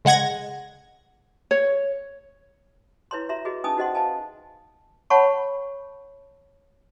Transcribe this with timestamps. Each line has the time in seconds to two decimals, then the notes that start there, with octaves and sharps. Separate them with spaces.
0.05 C#3 G#3 F#5 G#6 A#6
1.51 C#5
3.11 E4 B4 C#5 A#5 C6
3.29 F#4 E5 A#5 C6
3.45 F#4 G#4 B4 D#5
3.64 C#4 D#4 B4 G#5 A5 D#6
3.77 D#4 F#4 C5 D#5 F#5 C6
3.95 B4 D#5 F5 G#5 A5
5.10 C#5 F#5 A5 B5 C#6